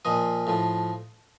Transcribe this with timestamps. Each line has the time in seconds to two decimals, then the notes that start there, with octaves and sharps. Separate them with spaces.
0.05 A#2 F3 D#5
0.47 A2 F3